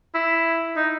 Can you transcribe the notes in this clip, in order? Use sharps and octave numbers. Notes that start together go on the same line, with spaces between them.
E4
D#4